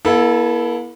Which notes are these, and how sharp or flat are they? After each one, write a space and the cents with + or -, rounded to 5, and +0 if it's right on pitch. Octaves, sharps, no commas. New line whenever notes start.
A#3 +45 E4 +0 A4 -15